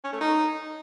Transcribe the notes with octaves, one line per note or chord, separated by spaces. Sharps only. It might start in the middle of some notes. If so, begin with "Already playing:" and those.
C#4
A3
D#4